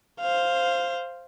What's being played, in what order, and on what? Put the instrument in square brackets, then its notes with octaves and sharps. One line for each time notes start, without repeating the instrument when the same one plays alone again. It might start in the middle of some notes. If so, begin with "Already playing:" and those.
[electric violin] C5 F5